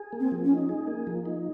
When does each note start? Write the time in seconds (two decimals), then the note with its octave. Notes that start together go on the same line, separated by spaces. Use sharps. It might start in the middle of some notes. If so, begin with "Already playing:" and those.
Already playing: G#4
0.12 A#3
0.20 C4
0.32 F3
0.44 C#4
0.50 D#4
0.69 G#4
0.87 A#3
1.07 F3
1.25 D#4